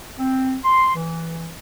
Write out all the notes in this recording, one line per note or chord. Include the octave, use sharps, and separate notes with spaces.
C4
C6
E3